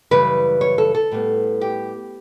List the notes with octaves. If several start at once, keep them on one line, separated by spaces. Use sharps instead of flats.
F#2 C#3 E3 G3 B4
C#5
A4
A4
A2 G3 B3
G4